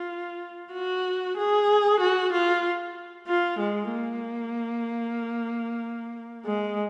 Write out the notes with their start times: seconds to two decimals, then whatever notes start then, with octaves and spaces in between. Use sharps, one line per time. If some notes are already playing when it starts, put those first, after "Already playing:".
Already playing: F4
0.74 F#4
1.37 G#4
2.00 F#4
2.33 F4
3.28 F4
3.59 G#3
3.92 A#3
6.45 G#3